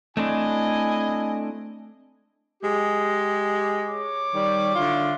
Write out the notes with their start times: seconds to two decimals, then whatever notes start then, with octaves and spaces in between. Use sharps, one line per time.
0.17 A3 C4 D4 E4 D#5 G#5
2.62 G#3 G4
3.88 C#5 D6
4.34 D#3 G3
4.76 D3 E4 F4